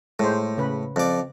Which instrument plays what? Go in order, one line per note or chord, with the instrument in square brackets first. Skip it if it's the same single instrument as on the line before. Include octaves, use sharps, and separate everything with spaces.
[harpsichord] A2 [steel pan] G#3 C5
[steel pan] C#3 B4
[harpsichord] F2 D5